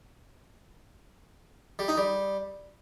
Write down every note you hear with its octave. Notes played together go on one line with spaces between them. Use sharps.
G3
D#4
G3